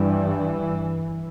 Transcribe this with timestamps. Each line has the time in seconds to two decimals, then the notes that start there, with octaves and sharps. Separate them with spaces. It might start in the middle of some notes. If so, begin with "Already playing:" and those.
Already playing: G2 E3